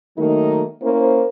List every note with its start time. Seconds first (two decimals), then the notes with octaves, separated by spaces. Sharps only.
0.18 D#3 F#3 A3 A#3 D#4
0.83 A#3 C#4 E4 A#4 C5